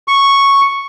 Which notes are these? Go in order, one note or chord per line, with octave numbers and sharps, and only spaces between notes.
C#6